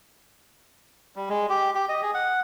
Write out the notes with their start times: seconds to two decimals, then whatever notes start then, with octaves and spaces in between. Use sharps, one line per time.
1.16 G3
1.29 G#3
1.49 G4
1.75 G4
1.89 D#5
2.02 G#4
2.14 F#5